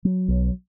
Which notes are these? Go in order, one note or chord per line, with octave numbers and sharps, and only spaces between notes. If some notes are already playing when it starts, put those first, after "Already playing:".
F#3
B1